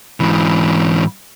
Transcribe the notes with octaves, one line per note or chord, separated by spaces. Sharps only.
G#2 E3